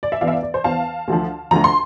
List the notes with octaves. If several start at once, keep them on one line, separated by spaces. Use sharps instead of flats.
D5
E5
E2 E3 D5 F5
E5
D5
D5
C5
E2 E3 F5 A5
D2 D3 F3
D2 D3 F3 A#5
C6